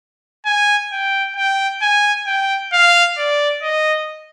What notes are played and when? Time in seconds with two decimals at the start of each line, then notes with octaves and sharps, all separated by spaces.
0.46 G#5
0.92 G5
1.36 G5
1.82 G#5
2.26 G5
2.73 F5
3.18 D5
3.62 D#5